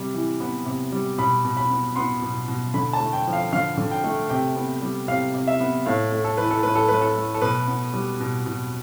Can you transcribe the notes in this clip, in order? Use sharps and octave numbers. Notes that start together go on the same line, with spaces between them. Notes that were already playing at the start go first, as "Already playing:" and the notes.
Already playing: C3 G3
E3
B3
C3
G3
B2 B5
B2
B5
B3
B3 C6
B2
B2
D3 B5
A5
A3
G5
F3
F5
D3 F5
D3
G5
A3
C3 G5
B3
G3
C3 F5
C3
E5
B3
A2 F5
A3
A4
E3 B4
A4
A2 B4
A4
A2 B4
A4
A3
A4
B2 B4
B3
G3
B2
B2